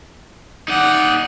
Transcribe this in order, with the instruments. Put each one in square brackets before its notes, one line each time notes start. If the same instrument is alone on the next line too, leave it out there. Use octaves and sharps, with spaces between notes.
[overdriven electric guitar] D#4 D5 [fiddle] F#5